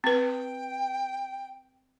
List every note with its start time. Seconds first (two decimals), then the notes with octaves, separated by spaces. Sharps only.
0.04 C4 B4 G5